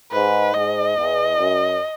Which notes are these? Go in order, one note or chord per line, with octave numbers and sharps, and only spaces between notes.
G#2 B4
G#2 D#5
E2
F#2